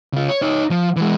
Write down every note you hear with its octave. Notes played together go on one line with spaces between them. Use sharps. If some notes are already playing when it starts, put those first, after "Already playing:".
C#3 F4
C#5
D#4 C#5
F3
E3 G#3